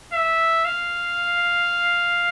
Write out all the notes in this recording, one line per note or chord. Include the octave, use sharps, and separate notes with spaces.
E5
F5